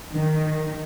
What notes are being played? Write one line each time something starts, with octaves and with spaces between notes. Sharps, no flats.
D#3